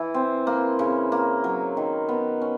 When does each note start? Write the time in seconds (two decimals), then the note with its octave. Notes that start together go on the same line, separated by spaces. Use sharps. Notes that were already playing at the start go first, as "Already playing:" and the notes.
Already playing: E3 E4
0.14 C4
0.47 A#3
0.79 C#3
1.12 A#3
1.44 F#3
1.77 D#3
2.09 B3
2.42 C#4